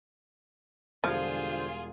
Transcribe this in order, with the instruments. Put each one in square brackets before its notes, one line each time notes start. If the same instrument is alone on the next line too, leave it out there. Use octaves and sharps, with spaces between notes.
[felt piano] E1 G3 G#6 [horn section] D3 C5 [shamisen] F3 [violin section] F4 G#4